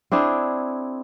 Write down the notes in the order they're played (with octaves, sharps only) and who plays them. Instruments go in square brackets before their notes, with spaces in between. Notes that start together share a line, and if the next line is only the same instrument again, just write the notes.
[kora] C4 D4 E4 G#4